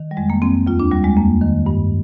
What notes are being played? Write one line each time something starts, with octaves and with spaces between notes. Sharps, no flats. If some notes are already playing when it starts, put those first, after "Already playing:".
Already playing: D#3
G3
F2 G#3
A#3
F2 C4
D#2 F4
D4
D#2 G3
G#3
F2 A#3
D#3
G2